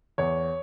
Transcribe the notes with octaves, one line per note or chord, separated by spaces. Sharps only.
E2 C#5